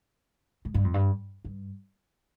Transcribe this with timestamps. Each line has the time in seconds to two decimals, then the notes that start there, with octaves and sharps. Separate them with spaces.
0.65 G#2
0.74 G2
0.84 F2
0.94 G2
1.45 G2